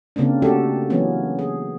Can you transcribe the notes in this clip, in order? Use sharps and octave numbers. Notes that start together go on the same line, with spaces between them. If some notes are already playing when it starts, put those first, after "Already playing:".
C#3 A#3 C4 D4
A3 D4 F#4 G4 A4
E3 F#3 A#3 B3 C#4
G#4